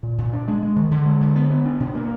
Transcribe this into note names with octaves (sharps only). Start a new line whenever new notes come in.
A#2
A#2
D4
G#3
G#3
D#3
D3
G#3
D3
B3
B3
D4
B2
A#3